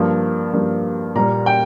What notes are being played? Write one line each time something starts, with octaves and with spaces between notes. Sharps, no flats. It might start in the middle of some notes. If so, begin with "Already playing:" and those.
Already playing: G2 F3 A#3
G2 F3 A#3
A#2 G3 A#3 A#5
G5